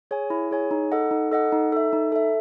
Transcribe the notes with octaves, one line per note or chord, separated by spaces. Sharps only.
G#4 C#5 G#5
E4
G#4 C#5 G#5
D#4
A4 D#5 F#5
D#4
A4 D#5 F#5
D#4
A4 E5
D#4
A4 E5